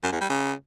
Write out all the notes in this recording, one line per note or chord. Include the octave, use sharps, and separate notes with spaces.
F#2
E2
G3
C#3